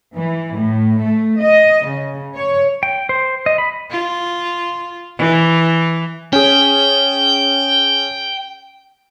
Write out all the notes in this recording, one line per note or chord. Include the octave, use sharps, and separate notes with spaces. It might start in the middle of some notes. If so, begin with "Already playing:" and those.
E3
A2
A3
D#5
C#3
C#5
G5
C5
D#5
B5
F4
E3
C#4 G#4 G5